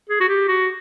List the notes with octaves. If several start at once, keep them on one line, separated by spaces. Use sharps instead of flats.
G#4
F#4
G4
F#4